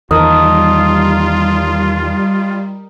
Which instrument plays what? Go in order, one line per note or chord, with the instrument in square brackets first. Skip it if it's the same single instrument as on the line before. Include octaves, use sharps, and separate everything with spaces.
[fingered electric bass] E2 D#3 [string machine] G3 [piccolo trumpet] F4 [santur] A#4 D#5 A5